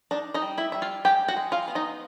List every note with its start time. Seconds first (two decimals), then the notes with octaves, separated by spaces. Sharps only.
0.11 D4 D#4 D5
0.34 D#4 D#5
0.42 G3
0.58 E4 E5
0.72 G3 E5
0.82 F4 F5
1.05 G#3 G4 G5
1.28 F#4 F#5
1.36 G#3
1.52 F4 F5
1.68 B3
1.75 D#4 D#5